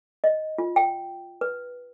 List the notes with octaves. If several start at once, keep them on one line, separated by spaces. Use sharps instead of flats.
D#5
F4
G5
B4